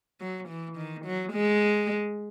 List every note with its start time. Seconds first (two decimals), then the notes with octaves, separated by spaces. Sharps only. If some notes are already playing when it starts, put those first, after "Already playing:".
0.21 F#3
0.48 E3
0.77 D#3
1.05 F#3
1.33 G#3